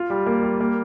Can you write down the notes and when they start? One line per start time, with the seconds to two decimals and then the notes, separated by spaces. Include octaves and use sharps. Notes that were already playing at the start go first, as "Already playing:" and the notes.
Already playing: F4
0.10 G3
0.26 A#3
0.43 G3
0.60 A#3